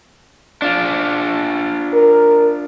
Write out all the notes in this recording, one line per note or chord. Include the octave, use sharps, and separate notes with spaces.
D4 F4
A#4